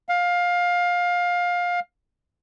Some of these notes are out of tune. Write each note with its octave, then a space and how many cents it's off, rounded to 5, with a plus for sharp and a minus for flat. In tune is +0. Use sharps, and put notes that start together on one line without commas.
F5 +20